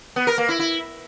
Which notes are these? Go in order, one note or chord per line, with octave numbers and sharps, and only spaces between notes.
B3
A#4
A#3
E4
E4